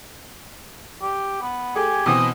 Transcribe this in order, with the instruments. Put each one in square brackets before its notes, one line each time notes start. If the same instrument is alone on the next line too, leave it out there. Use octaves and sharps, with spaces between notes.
[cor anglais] G4
B3
[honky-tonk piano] A3 G#4 [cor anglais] G4 [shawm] G#5
[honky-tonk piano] B2 E3 C4 [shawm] D#6